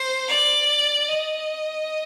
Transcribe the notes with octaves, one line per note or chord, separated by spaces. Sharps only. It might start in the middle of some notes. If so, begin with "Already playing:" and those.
Already playing: C5
D5
D#5